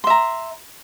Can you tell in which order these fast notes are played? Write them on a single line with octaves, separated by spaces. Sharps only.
C6 E5 A#5